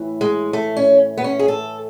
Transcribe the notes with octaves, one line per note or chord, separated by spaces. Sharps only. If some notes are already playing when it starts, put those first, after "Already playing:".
Already playing: A2 E3
G#3
A3
C#4
B3
C#4
G#4
A4